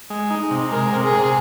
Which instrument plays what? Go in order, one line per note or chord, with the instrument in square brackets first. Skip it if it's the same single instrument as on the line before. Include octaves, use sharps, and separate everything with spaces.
[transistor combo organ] G#3
D#4
C3
[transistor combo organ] G#3 [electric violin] A#4
[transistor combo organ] C3
[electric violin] G#4
[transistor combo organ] C3